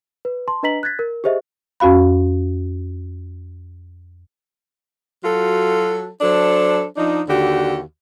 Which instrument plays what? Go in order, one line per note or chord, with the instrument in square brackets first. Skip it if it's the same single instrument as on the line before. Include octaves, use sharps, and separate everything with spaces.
[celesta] B4
A5 C6
D4 B4 D#5 A#5 B6 F#7
F#6 G#6 A6 B6
A#4
G4 G#4 C5 D#5 E5
[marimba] F2 C#4 F#4 F5 B5
[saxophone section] F#3 F4 F#4 A4
F#3 D4 A4 C5
F3 D4 D#4
D#2 D3 F#4 G4